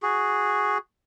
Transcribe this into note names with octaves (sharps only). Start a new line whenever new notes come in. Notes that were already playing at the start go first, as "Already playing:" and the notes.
F#4 G#4